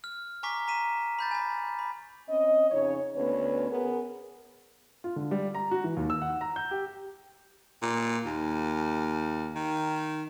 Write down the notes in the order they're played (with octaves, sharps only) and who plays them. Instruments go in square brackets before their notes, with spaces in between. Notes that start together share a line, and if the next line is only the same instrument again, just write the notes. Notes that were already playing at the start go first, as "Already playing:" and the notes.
[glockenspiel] F6
G#5 A#5 C#6 D6 B6
A#5 B6 D#7 E7
B5 G6 A6
G#5 B5
B5
[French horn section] C4 C#4 D#5
F2 C#3 D#4 C#5
D2 B3 C#4 B4 C#5
B3 G#4 A#4
[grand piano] F4
D3
G3
A#5
F#4
E3
D#2
E6
F#5
A#5
G6
G4
[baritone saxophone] A#2
D#2
D#3